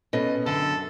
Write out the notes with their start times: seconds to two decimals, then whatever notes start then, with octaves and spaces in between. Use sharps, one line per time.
0.13 B2 A3 B3 C#4 D#5
0.46 F#2 D3 A4